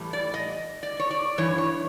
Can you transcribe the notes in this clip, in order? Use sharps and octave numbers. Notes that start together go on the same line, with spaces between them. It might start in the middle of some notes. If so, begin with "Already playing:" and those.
Already playing: A2 E3 G3
D5
D#5
D5
C#5
D5
G2 E3 C#5
C#5